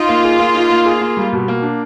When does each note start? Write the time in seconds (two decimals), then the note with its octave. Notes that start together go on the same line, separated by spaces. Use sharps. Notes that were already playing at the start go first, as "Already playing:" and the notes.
Already playing: D#4 F4
0.09 A#3
0.24 G#4
0.40 A#3
0.55 D#4
0.70 A#3
0.85 G#4
1.01 A#3
1.17 G3
1.33 B2
1.48 A#3
1.62 D4